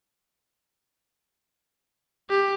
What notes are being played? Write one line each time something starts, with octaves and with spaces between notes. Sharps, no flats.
G4